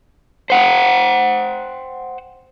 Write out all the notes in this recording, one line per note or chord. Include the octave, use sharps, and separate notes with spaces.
C5 F#5 G5